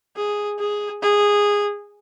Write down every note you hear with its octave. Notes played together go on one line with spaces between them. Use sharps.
G#4
G#4
G#4